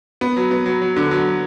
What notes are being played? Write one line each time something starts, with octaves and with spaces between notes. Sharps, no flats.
B3
F#3
B3
F#3
F#3
D3
F#3